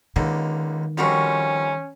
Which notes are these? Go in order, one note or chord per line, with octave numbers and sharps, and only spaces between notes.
C#2 D3 D#3 A#3
F2 F3 G3 C4 C#4 F#4 A#4